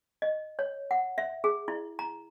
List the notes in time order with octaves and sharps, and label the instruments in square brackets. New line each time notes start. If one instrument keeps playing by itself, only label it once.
[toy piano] D#5
C#5
F#5
E5
G#4
E4
A#5